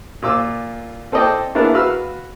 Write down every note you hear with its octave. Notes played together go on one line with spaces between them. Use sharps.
A#2 F4 D6 E6
C4 A4 D5 D#5 G5
A#3 B3 D4 E4 G#4 A#4
F#4 B4 F5 E6 F6